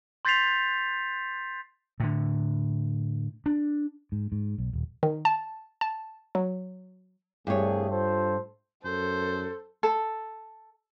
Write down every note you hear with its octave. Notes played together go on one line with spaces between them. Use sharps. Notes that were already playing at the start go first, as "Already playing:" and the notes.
C6 G6 A6 B6 C7 F7
A2 D3
D4
G#2
G#2
B1
D#1
D#3
A5
A5
F#3
C2 G2 A3 G#4 C#5
F4 A4 C5
F#2 A4 C5
A4